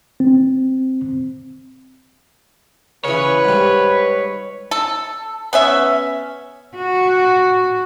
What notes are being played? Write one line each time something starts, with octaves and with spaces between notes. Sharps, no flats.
C4
C#3 E3 B4 C#5
G#2 G3
A4
B3 C#4 E5
F#4